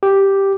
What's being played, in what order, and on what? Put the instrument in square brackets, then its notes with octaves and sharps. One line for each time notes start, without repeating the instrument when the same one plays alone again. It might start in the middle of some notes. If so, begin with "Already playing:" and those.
[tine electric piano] G4